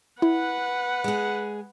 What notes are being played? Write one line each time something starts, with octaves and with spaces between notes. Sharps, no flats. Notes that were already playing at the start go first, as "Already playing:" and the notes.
E4 B4 F#5
G#3 G#4